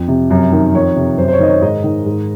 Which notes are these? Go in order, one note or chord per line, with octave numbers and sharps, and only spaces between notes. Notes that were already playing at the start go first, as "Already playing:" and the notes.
Already playing: F2
C3
F#2
D#3
F2 C#5
C3
F#2 C5
C5
C#5
D#3 D#5
C#5
G#2 D#5
D#3
G#2